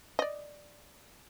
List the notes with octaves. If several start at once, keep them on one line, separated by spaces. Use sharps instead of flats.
D5 D#5